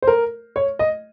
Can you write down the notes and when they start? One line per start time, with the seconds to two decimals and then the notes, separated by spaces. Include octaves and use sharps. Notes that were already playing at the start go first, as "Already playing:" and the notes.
0.02 C5
0.07 A#4
0.56 C#5
0.79 D#5